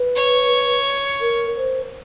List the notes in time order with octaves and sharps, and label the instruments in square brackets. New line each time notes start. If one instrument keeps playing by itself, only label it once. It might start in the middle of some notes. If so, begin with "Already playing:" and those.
Already playing: [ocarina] B4
[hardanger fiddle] C#5
[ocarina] A#4
C5